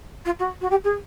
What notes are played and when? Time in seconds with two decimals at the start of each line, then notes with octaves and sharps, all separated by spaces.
0.25 F4
0.39 F#4
0.61 F#4
0.70 G4
0.84 G#4